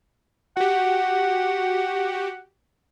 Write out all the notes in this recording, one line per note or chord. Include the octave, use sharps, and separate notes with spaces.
F#4 G4 F#5